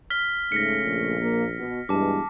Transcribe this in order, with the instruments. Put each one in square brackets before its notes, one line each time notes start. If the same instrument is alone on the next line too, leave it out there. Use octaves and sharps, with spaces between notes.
[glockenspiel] F6 B6 G7
[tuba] G#2 [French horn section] C#3 A3 [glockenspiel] A#6 B6 C#7
[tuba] A#1
[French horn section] A#3
B2
[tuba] G2 [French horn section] B2 E3 G#3 [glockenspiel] A5 D6